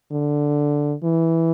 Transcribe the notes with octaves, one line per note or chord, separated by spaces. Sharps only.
D3
E3